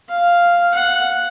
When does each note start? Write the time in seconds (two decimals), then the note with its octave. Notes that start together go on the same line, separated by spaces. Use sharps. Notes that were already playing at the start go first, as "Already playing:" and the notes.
0.10 F5
0.74 F#5